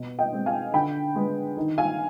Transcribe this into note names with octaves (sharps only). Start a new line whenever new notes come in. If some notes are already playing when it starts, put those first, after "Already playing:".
Already playing: B2
D#5 G5
G#3 C4
F5 G#5
D3 G5 B5
G#3 B3
D#3
F5 G#5